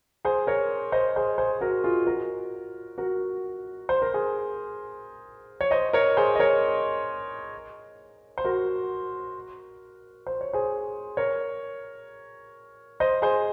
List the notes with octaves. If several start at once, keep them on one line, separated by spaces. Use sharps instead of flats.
G#4 C5
A#4 C#5
C5 D#5
G#4 C5
G#4 C5
F#4 A#4
F4 G#4
F#4 A#4
F#4 A#4
C5
A#4
G#4 C5
C#5
C5 D#5
A#4 C#5
G#4 C5
D#5
A#4 C#5
C5
F#4 A#4
C5
C#5
G#4 C5
A#4 C#5
C5 D#5
G#4 C5